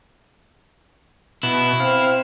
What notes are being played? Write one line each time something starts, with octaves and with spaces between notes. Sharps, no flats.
B2 E4
C4 F5